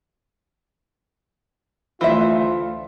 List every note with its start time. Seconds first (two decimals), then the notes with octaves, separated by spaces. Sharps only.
2.01 D2 E3 F4 C5 E5